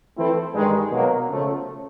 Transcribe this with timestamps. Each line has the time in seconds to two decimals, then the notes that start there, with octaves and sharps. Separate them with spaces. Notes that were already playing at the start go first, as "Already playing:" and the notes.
0.17 E3 A3 C4 E4 A4
0.55 G2 D#3 G#3
0.92 B2 F#3 A#3
1.28 C#3 F3 A3